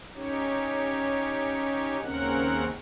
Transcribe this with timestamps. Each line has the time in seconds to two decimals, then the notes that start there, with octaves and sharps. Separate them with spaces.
0.15 C#4 D#4 G4 C#5
2.02 D#2 C#3 C4 C#4 A#4 F#5